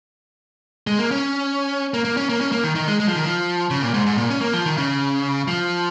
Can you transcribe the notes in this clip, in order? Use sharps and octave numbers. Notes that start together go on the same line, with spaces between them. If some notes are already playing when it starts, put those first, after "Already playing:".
G#3
A#3
C#4
A#3
A#3
C#4
A#3
C#4
A#3
D#3
D#3
G#3
G#3
F3
D#3
F3
C#3
A#2
G#2
G#2
A#2
C#4
A#3
F3
D#3
C#3
F3